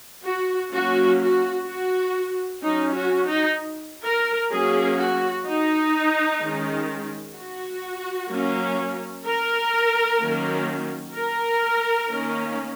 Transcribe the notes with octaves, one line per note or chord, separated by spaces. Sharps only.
F#4
F#3 A#3 C#4 F#4
F#4
F#4
F#3 C#4 D#4
F#4
D#4
A#4
F#3 A#3 C#4 G#4
F#4
D#4
D#3 G#3 C#4
F#4
F#3 A#3 C#4
A#4
D#3 F#3 A#3 C#4
A#4
D#3 A#3 C#4